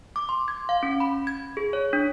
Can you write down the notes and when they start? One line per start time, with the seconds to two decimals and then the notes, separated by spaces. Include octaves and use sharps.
0.16 D6
0.29 C6
0.48 G#6
0.69 F5
0.83 C#4
1.00 B5
1.27 G#6
1.57 G#4
1.73 C#5
1.93 D4